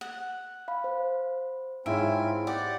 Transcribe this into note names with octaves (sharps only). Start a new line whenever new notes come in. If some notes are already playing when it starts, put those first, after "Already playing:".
F#5
F5 B5
C5
G#2 C4 E4 F4 C#5 E5 G#5 D7
G4 D5 F#5